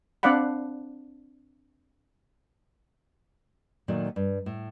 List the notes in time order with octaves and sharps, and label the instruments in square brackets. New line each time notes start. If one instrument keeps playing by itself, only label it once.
[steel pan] C4 D4 D5 F5 F#5 B5
[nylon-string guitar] A#2 D#3 F#3 A3
G2
A2